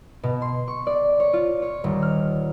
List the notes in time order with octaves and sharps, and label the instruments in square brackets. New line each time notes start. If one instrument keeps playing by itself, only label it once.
[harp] B2
C6
C#6
D5
C#5
F4
C#5
D#1
F6